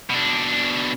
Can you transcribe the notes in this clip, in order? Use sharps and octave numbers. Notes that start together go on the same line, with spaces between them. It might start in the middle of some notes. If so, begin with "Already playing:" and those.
B2 D4